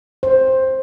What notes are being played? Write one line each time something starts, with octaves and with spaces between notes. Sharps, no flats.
C5